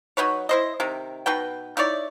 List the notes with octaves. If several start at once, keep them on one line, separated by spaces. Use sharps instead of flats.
F#3 D#4 B4 C#5
E4 C5 D#5
C3 D#3
B2 D#4 B4 G5
D#4 E4 C#5 D5